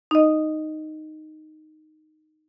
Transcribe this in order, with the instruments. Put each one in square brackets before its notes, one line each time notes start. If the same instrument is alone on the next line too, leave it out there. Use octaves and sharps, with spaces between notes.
[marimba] D#4 D#5